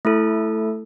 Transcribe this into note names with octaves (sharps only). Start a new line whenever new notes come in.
A3 E4 A4